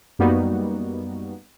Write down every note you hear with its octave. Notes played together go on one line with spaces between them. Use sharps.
F#2 G3 A#3 B3 D#4 F#4